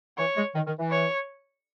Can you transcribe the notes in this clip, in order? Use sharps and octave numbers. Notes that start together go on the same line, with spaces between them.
E3 C#5
G#3
D#3
D#3
E3
C#5